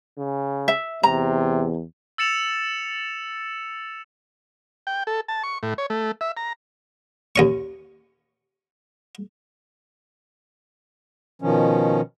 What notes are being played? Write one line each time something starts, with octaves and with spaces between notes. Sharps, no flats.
C#3
E5
E2 C3 A#5
E6 A6 C#7 E7 F7
G5
A4
A5
C#6
A2
C#5
A3
E5
A#5
D#2 C#4 C#6
B2 D#3 F3 C#4